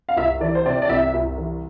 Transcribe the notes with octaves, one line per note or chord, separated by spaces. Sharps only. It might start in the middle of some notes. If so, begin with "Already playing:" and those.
F5
C2 E5
E3 D5
C5
C3 D5
D5
C2 E5
C2
E3